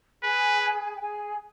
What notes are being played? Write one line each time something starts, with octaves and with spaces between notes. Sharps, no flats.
G#4 B4 G#5
G5
G#4 G#5